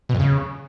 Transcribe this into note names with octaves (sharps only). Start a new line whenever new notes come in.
B2
F2
C#3